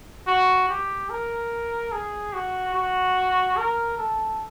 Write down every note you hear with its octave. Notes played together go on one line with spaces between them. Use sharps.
F#4
G4
A#4
G#4
F#4
F#4
A#4
A4